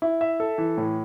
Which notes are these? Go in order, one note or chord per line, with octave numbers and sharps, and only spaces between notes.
E4
E5
A4
E3
A2